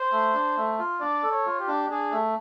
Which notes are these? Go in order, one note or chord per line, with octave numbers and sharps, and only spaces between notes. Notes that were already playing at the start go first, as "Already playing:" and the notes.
Already playing: C5
A3
D4
A3
F4
D4 D5
A4
C#5
F4
G4
D4
D4 G#4
A3